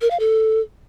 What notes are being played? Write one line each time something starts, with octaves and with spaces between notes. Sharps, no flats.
A#4
F5
A4